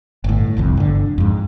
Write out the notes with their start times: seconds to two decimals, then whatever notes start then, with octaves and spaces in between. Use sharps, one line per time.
0.24 G1 A2
0.57 F#1 C2 F2
0.77 G1 D3
1.18 F2 G#2